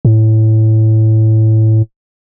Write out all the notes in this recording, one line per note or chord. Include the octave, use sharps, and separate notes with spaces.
A2